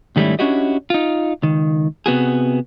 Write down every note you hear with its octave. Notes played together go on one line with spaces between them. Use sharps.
G#2 D#3 G3 A3 C#4 E4
C#4 D4 E4 F#4 G4 D#5
D#4 F4
C#2 D#3
C3 B3 F#4 G#4